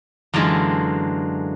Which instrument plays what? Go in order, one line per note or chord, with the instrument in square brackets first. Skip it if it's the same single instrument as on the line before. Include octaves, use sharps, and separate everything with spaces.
[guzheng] F#2 D3 E3 G#3 F4 A4